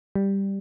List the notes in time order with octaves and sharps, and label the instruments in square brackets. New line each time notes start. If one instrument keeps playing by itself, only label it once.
[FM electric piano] G3